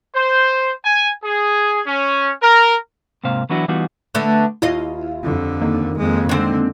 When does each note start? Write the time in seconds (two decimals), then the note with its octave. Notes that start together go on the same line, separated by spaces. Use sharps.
0.16 C5
0.85 G#5
1.24 G#4
1.87 C#4
2.42 A#4
3.24 G#2 C3 A#3 C5 F5
3.50 E3 F#3 B3 D4 E4 F#4
3.68 E3 G3 B3 D#4 F4 F#4
4.15 D3 A3 B3
4.62 D#2 E4 F4 D#5 F5
5.23 F2 D3
5.61 D#3 A#3
5.97 F2 G#3
6.29 D3 G#3 C4